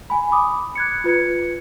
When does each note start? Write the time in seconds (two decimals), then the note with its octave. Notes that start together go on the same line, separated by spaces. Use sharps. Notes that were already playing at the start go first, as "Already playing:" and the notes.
0.10 G#5 B5
0.32 B5 D6 D#6
0.75 F#6 G#6 C#7
1.04 F4 B4 G#6 C#7